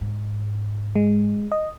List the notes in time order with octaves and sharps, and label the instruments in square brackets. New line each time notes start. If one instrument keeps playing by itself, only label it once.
[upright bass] G#2
[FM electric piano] G#3
D#5